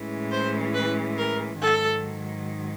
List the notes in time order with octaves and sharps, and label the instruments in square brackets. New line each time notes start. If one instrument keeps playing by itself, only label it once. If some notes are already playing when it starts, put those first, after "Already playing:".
Already playing: [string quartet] A2 E3 G#3 C#4
[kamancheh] C5
B4
A#4
[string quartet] G#2 D#3 F#3 [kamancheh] A4